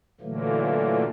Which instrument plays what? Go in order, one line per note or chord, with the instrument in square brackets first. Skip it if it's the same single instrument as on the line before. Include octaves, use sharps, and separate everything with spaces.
[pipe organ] A#2 D3 E3 F#3 A3 A#3